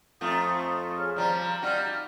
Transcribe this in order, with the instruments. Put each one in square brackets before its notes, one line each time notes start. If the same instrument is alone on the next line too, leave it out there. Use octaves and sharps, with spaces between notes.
[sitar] F2 A3 F4 [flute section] A#5 D#6
[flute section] G#4 C#5 F6
[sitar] F3 G3 [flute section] A#5
[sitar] G3 D#4 F#4 [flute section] F6